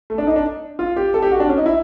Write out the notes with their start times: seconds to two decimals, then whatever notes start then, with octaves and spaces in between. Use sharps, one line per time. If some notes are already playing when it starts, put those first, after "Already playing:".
0.10 A3
0.18 D4
0.27 D#4
0.36 D4
0.79 F4
0.96 G4
1.14 A4
1.22 G4
1.31 F#4
1.40 D4
1.49 C#4
1.57 D#4
1.66 E4